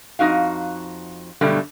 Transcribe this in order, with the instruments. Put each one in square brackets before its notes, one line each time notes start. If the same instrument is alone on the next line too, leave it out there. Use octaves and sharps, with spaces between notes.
[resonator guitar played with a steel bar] F2 D#4 F#4 F5
G2 B2 D3 F#3 G3 A3